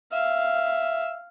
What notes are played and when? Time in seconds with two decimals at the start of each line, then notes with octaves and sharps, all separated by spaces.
0.13 E5 F5